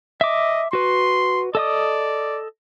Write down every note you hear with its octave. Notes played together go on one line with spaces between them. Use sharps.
D#5 E5 D6
F#4 B4 C6
A4 D5 D#5 D#6